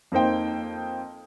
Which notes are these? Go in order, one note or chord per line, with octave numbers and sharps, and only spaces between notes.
F2 A#3 D#4 C5 G5